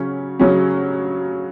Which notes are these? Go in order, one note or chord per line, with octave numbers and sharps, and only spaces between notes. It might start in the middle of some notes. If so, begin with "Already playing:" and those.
Already playing: C#3 F#3 C#4
C#3 F#3 C#4